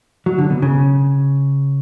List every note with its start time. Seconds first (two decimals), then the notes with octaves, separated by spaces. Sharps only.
0.26 F#3
0.38 D3
0.50 B2
0.62 C#3